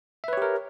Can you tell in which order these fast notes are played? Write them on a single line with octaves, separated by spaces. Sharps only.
E5 B4 C#5 G4 A#4